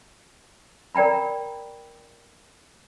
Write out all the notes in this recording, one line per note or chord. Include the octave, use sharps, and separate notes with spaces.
A#4 D5 G5 A#5 B5